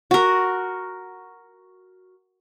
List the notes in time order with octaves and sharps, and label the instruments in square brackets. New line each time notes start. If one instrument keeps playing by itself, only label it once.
[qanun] F#4 A#4